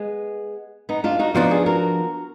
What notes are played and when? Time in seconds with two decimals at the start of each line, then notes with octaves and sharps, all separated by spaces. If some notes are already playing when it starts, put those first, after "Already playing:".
Already playing: G#3 B3
0.89 B3 D#4
1.04 D4 F4
1.19 D#4 F#4
1.35 F3 B3 D4 D#4 F#4
1.51 F4 G#4
1.66 F#4 A#4